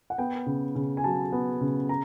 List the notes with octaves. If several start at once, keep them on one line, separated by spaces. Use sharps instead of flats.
F#5
B3 G5
C#3
C#3
G#5
F#3 A5
B3
C#3
A#5